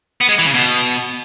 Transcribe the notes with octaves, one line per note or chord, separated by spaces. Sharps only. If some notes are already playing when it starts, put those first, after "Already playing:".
B3
G#3
E3
C#3
B2